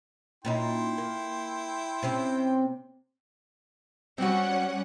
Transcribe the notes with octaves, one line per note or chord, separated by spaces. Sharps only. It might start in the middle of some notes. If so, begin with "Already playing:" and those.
A#2 C#4 D#4 E4 G5 C6
A#3
C3 C4 C#4
G3 C4 C#4 F#4 F#5